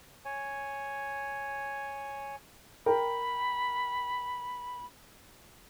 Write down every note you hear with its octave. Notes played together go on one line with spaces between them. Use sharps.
C#5 G#5
A#4 G5 B5